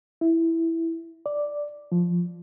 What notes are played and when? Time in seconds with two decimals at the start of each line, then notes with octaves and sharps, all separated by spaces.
0.21 E4
1.26 D5
1.92 F3